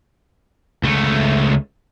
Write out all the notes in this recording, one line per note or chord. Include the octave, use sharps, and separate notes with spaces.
C#2 A3